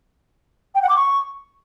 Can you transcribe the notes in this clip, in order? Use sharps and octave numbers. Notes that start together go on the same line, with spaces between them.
G5
F#5
D6
C#6